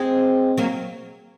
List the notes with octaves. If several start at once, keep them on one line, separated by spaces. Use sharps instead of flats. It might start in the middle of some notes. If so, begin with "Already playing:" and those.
Already playing: G#3 C4
F#3 A#3